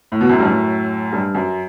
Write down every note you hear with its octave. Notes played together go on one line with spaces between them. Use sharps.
A2
B2
F#2 A2
G2
F#2 A2
G2
F#2